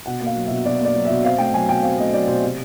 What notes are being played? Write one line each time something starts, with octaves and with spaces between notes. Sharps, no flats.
B2 F#5
A#3
F5
F#3
B2 E5
B2 D5
A#3
D5
F#3
B2 E5
C4 F5
A3 G5
F#3 G#5
B2 G5
C4 F5
A3 D#5
F#3 D5
B2 C5
C3